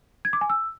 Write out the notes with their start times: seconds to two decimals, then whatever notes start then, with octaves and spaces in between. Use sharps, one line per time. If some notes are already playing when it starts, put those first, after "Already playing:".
0.25 G#6
0.33 D6
0.41 G#5
0.50 E6